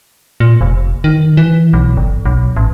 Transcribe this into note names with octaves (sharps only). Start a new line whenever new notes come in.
A#2
F1
D#3
E3
B1
G1
B1
A1